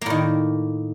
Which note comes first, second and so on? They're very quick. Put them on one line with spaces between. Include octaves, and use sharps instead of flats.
A#3 A2 D#3